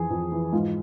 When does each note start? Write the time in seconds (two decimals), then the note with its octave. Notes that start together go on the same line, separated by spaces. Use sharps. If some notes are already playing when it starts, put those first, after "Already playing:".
Already playing: F2 E3 G#4
0.11 F2
0.32 E3
0.53 G#2 F4